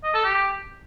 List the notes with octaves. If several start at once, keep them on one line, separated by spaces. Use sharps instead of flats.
D#5
A4
G4